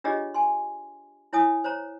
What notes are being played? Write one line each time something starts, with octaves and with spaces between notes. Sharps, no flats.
D4 F4 G4 G#4 C#5 D#5
G#5 C6
E4 C#5 G#5 D#6
C5 C#5 A#5